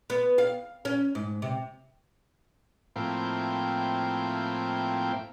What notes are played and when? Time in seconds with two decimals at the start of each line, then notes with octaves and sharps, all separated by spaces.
0.10 B3
0.38 F5
0.85 C#4
1.15 G#2
1.42 C3
2.96 A2 F3 A#3 C4 E4 G5